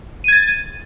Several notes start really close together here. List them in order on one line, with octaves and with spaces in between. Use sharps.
D#7 G#6 A6